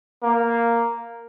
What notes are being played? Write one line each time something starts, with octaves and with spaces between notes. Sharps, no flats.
A#3